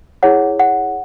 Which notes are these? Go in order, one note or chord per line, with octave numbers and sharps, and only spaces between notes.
E4 G#4 C#5 F#5
F#5